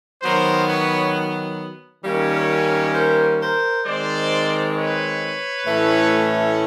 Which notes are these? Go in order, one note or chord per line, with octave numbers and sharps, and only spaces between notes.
D#3 F#3 B3 A#4 C5
B4 C#5
D#3 G3 A#3 C#4
A#4 C5
A#4 C5
D#3 G#3 C4 C5 D5
B4 C#5
A2 E3 A3 C#4